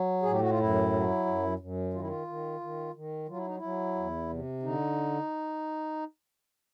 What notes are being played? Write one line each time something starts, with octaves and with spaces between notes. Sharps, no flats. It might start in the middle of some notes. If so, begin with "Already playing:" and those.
Already playing: F#3
A2 G#4
G4
F#4
F4
F#2 E4
F#3
F#2
F#2
D#3 F4
E4
F4
D#3
D#3
D#3
F#3 F4
E4
D#4
E4
F#3
E2
C3
D3 D#4